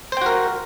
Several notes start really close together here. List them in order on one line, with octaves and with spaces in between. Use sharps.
C5 G5 F#4 A#4